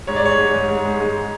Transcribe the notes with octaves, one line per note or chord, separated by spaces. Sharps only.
G#2 C#5
D5
G#3 C#5
G#2
G#2
G#2
G#3
G#2